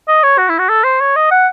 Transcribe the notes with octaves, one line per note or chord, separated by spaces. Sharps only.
D#5
C#5
F#4
E4
F#4
A4
C5
C#5
D#5
F#5